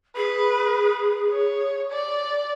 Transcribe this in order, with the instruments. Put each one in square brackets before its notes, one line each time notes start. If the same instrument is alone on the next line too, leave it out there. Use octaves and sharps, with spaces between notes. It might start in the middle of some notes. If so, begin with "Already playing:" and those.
[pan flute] G#4 [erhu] B4
[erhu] C#5
D5